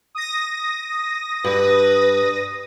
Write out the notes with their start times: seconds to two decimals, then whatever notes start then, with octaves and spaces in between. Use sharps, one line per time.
0.15 D#6 A#6
1.44 G2 B4